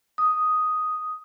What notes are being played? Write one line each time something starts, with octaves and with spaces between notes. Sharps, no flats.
D#6